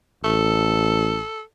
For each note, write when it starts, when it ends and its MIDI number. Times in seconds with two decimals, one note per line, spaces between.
0.24 1.21 33
0.24 1.41 69